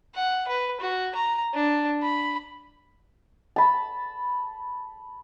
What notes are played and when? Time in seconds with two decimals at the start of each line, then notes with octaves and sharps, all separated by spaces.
0.15 F#5
0.48 B4
0.81 F#4
1.15 A#5
1.54 D4
2.03 B5
3.56 A5 B5